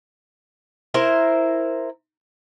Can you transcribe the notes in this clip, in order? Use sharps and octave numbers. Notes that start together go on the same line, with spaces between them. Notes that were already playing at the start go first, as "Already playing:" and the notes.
E4 A#4 C5